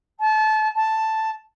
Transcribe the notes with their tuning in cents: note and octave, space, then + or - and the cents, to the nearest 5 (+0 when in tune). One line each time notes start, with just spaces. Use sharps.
A5 -30
A5 +0